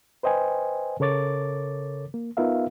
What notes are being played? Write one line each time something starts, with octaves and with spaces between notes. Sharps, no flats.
B4 C5 D#5 G5 G#5
C#3 A4 A#4 C#5 D6 A6
A#3
B3 D#4 F4 A#4 E5 F5